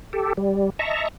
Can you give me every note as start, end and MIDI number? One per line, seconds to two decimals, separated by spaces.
0.13 0.33 67
0.13 0.33 69
0.37 0.70 55
0.79 1.08 75
0.79 1.08 76
0.79 1.08 81
0.79 1.08 82
0.79 1.08 85